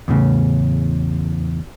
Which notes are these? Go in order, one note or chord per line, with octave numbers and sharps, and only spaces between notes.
E2 A2 C#3